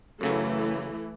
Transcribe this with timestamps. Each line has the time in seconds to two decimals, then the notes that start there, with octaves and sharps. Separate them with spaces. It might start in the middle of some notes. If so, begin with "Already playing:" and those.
0.21 F#2 C#3 E3 F#3 A3